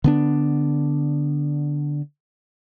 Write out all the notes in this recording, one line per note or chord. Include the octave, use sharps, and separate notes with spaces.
D3 B3 D4